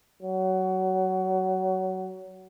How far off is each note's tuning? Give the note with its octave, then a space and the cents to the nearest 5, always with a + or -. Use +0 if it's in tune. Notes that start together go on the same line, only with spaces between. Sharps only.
F#3 +20